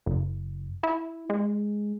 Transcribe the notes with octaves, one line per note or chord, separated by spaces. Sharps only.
F#1
E4
G#3